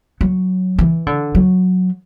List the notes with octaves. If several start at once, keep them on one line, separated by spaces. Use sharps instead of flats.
F#3
E3
D3
F#3